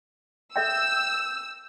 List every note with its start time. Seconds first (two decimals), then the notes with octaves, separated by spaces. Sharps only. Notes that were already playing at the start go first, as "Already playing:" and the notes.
0.56 A4 E5 G5 E6 G6